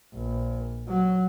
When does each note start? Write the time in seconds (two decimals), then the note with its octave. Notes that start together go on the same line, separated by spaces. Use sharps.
0.14 A#1
0.88 F#3